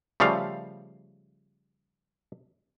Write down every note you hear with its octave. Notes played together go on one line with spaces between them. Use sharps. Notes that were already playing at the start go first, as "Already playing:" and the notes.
C#3 F3 G3 A3 F5